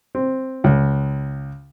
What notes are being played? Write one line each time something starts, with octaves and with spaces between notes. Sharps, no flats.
C4
C#2